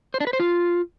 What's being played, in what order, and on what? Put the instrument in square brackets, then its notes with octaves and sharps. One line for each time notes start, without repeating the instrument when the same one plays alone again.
[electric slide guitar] C5
D4
B4
C5
F4